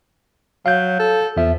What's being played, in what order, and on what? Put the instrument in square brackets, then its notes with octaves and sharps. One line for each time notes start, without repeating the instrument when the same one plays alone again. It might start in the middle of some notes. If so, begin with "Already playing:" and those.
[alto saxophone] F#3 [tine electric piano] F5 G6
[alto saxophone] A4
[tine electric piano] E2 E5 [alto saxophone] F3